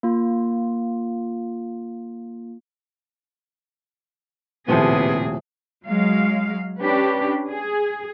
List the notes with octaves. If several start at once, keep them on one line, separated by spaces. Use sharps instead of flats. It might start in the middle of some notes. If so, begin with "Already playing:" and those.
A#3 F4
D#1 A2 C3 F3 B3 C#4 G#4
F#3 G#3 F5
C#4 D4 G4 B4
G#4